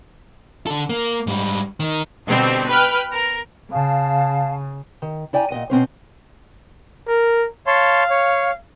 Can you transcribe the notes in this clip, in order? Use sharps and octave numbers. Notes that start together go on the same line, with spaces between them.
D3 A4
A#3
G#2 G3
D#3
B2 D3 G3 C4
B4 G5 F6
A#4
C#3 F5 A5
D#3
E4 D5 G5 G#5 A#5
A#2 C#3 D#5 F#5
B2 C4 C#4 C5
A#4
C#5 F5 A5 C6
C#5